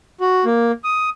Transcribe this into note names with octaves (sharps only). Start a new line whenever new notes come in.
F#4
A#3
D#6